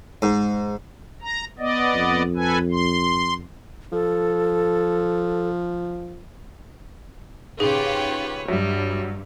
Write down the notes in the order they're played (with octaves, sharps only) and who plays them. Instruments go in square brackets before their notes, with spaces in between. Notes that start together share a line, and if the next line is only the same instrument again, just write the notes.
[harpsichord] G#2
[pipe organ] A#5
B3 D5 D#5
[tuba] F2
[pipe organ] A4 B4 G#5
C6
[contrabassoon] F3 [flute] A4
[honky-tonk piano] G#2 C#3 [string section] F4 G4 [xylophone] G#4 [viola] B4 C#5
[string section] G2 [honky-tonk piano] F#3 E5 [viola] G3